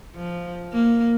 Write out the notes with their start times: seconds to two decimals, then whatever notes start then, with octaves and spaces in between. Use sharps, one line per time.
0.15 F3
0.73 A#3